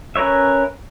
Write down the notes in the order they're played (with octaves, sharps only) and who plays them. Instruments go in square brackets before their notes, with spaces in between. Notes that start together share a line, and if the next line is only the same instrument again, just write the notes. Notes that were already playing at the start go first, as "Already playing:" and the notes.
[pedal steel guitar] C#4 A#4 B4 C#5 E5